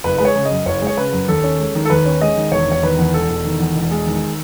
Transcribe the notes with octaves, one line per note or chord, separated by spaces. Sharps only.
F#1 B4
G#3 B4
C#5
C#3
D#5
F#2
F#1 C#5
G#3
C#5
C#3 B4
F#2
D#2 A4
C#4
G#3
D#3
A4
D#2 B4
C#4
G#3 D#5
D#3
E1 C#5
E1 C#5
D#3 B4
E2
E1 A4
E1
D#3
E2
E1
G#3
D#3